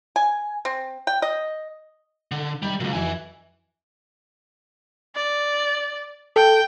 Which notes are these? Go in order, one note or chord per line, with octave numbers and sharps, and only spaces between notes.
G#5
C4
G5
D#5
D3
C3 D#3 G3 G#3
C#2 A#2 F#3 A#3
F2 E3 F#4 E5 G#5
D5
A4 G5